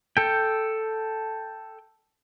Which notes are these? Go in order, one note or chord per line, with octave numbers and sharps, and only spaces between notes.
A4 G5